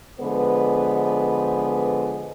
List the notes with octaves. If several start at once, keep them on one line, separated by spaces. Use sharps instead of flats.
D3 F3 G#3 B3 B4 C5